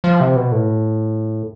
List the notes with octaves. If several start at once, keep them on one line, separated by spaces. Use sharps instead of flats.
F3
C3
B2
A2